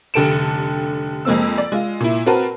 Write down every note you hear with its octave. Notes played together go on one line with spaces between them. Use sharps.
F1 D3 G4 A4 D7 E7
F2 G#3 A#3 C4 E6
D5
G#3 F4
A#2 E4
C4 F#4 A#4 B4 A5